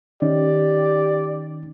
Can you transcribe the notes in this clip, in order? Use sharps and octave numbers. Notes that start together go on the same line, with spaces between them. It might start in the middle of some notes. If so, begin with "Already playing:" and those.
D#3 C#4 D#4 G4 D5